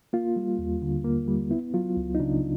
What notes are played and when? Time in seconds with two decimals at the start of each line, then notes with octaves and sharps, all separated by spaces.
0.13 A#3 F4
0.36 G3
0.59 D#2
0.82 D3
1.05 A#3
1.28 G3
1.51 B3 E4
1.74 F#3 F4
1.97 C#2
2.15 D#4
2.20 C#3 D4